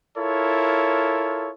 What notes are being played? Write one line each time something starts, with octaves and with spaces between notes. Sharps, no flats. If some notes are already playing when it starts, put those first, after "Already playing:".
E4 F4 A4 A#4 C#5